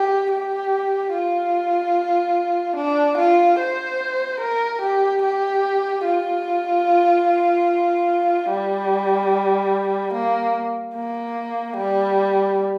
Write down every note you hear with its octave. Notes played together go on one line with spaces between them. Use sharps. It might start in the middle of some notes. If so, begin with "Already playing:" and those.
Already playing: G4
G4
F4
D4
F4
C5
A#4
G4
G4
F4
G3
A#3
A#3
G3